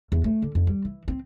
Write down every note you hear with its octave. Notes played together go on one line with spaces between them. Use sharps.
E2
A3
D3
F2
G3
E3
C4